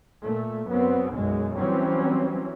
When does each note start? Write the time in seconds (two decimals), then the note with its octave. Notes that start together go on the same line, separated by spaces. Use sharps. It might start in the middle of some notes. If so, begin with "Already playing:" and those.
0.23 A#2 A3
0.69 F#2 B3 C4
1.13 B1 F#2 G#3
1.58 E3 F#3 G3 C4 C#4